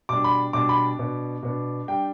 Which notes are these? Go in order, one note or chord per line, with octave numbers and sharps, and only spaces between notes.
B2 G3 D4 D6
B5
B2 G3 D4 D6
B5
B2 B3 D4
B2 B3 D4
G3 D4 G5